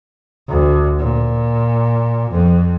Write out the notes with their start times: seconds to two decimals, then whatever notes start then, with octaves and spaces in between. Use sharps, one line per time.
0.48 D2
0.99 A#2
2.31 F2